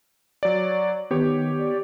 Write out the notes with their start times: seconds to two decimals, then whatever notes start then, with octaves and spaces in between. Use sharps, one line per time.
0.43 F#3 C#5 D5
1.11 D#3 B3 G4 C#5
1.58 D5